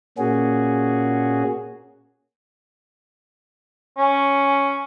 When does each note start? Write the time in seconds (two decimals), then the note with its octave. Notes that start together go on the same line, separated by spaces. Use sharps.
0.18 A#2 A#3 C#4 F#4 G#4
3.98 C#4